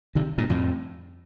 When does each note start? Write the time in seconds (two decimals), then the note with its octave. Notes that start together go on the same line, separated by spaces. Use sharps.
0.15 C3 D#3
0.38 G2 A#2
0.50 F2 A2